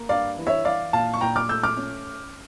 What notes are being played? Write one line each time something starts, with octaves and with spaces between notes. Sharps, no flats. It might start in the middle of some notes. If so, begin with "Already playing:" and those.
Already playing: A#3
G2 D5 F5
E3
C#5 E5
E4 D5 F5
A#2 F5 A5
C#6
A#2 G5 A#5
D6 F6
A3 E6 G6
D6 F6
C#4